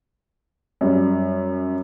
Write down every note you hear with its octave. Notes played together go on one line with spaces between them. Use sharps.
F#2 G3